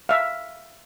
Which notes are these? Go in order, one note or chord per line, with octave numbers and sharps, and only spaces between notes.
E5 F5